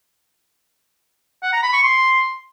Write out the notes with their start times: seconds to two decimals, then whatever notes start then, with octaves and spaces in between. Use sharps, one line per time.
1.43 F#5
1.53 A#5
1.63 B5
1.73 C#6
1.83 C6